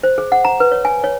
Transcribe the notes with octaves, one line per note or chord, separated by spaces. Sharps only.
C5
G#4
F#5
A#5
B4
C#5
G#5
C#5